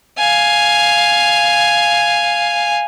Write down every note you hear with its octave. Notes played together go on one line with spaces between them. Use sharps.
F5 G#5